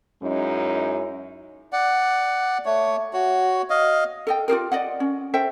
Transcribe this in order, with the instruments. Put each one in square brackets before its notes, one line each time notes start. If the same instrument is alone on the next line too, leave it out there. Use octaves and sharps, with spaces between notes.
[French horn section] F#2 G#3 C#4 D#4 E4
[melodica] D5 F#5
A3 C#5
F#4 C#5
D#5 F5
[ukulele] A4 D#5 G5
F4 G4 G#4 A#4
D5 D#5 F#5
C#4
A4 C5 E5 G5